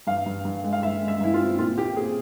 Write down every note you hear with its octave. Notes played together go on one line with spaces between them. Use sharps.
G2 F5
G2
G2
G#3
F5
G2 E5
G#3
E5
G2 E4
F4
C4
A#2 F4
A#2 G4
C4 G#4